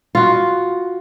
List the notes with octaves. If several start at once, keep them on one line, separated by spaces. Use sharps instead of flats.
F4 F#4